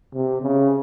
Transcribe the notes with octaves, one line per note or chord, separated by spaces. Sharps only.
C3
C#3